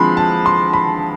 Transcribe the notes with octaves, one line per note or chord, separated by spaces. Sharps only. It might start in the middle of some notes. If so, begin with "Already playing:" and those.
Already playing: D3 F3 G#3 C4 B5 C6
A5
C6
B5